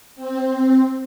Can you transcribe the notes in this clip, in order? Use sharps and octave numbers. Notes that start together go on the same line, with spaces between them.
C4